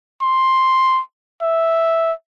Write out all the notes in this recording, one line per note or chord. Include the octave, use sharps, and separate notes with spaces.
C6
E5